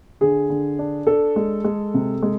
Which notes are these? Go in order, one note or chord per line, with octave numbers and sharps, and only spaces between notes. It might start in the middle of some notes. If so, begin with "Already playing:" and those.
D3 G#4
D3
D4
D4 A4
G#3
G#3
C3
G#3